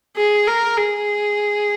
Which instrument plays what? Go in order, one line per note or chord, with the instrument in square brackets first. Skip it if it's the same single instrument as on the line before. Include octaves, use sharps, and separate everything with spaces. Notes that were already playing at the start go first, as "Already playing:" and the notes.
[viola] G#4
A#4
G#4